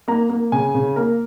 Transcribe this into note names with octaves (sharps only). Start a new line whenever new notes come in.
A#3 A#5
A#3
C#3 G#5
C#3
A#3 A#4